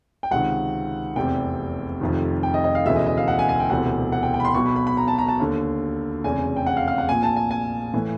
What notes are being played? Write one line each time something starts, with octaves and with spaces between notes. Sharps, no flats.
G5
C#2 C3 D#3 F#5
F1 E2 C3 G5
F1 F2 C3 D#3
G5
D#5
D#5
F5
E1 D2 C#3 E3 E5
D#5
D#5
F5
F#5
G#5
G#5
G5
E1 D2 C3 E3 F#5
F#5
G5
G5
B5
C6
B1 B2 C#6
B5
B5
B5
A#5
A5
A#5
A5
D#2 D3
F1 E2 C#3 G#5
G5
F#5
F5
F5
F#5
A#1 A#2 G#5
A5
G#5
G#5
A2 E3